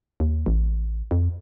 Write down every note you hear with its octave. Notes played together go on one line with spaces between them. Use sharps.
D#2
A1
F2